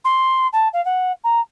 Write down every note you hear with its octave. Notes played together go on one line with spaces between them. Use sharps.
C6
A5
F5
F#5
A#5